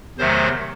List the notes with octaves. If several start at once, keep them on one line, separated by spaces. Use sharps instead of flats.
E2 C3 D#3 F#3 A3 C5